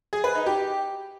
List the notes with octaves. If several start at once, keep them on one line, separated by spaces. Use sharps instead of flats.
G#4
B4
D#4
G4